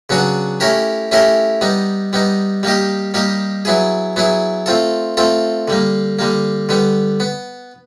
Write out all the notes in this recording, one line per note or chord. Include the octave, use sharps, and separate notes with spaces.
C#3 F#3 B3 D4 F#4
A3 C#4 E4 G4 A#4
A3 C#4 E4 G4 A#4
G3 B3 D#4
G3 B3 D#4
G3 A#3 D#4 G4
G3 A#3 D#4 G4
F#3 B3 E4 G#4
F#3 B3 E4 G#4
A3 C4 F4 A4
A3 C4 F4 A4
D3 G3 A#3
D3 G3 A#3
D3 G3 B3
B3